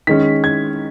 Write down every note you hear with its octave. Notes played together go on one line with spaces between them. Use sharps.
D#3 G#3 C#4 B6
G#6